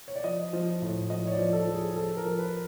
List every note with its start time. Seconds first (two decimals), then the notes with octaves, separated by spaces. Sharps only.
0.08 C#5
0.16 D5
0.24 F3 D#5
0.53 F3
0.82 A2
1.10 F3 D#5
1.27 C#5
1.32 D5
1.38 F3
1.53 A4
1.67 F3
1.75 G#4
1.95 F3 A4
2.17 A#4
2.25 F3
2.39 B4